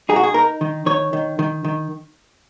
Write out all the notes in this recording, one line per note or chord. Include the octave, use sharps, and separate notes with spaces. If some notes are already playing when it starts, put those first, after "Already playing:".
D#4 G#4
F#4
G#4
D#4 A#4
D#3
D#3 C#5
D#3
D#3
D#3